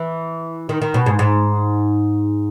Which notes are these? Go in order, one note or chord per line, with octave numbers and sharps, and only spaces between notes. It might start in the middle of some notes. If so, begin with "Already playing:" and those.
Already playing: E3
D#3
D#3
B2
G#2
G#2